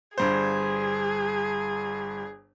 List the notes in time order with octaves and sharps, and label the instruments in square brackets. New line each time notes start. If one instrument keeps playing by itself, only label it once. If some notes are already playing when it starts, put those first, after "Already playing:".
[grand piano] G1 G2 C5 [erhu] G#4